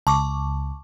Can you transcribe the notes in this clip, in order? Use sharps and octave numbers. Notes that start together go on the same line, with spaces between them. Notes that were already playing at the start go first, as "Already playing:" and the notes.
C#2 A5 C#6 D6